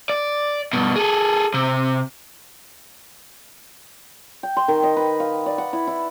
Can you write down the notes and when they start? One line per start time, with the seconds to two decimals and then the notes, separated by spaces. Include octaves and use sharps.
0.09 D5
0.73 G2 B2
0.96 G#4 A4
1.54 C3
4.43 G5
4.57 C6
4.68 D#3
4.83 D#5
4.97 B4
5.20 F5
5.46 D5
5.58 F#5
5.73 E4
5.87 E4